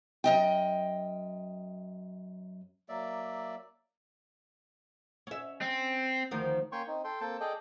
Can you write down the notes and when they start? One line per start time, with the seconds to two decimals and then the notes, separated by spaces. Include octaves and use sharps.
0.24 F#2 D#5 G5
2.89 F#3 A#3 D5 E5
5.27 C#4 E5
5.61 C4
6.31 D2 D#3 F3
6.72 A#3 C#4 C#5 G5 C6 C#6
6.87 C4 D#4
7.04 A4 G5 C6
7.21 A#3 C4 A4 G5 A5
7.40 G#4 A4 D5 D#5 G5